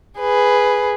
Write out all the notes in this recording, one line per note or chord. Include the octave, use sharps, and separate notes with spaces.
G#4 B4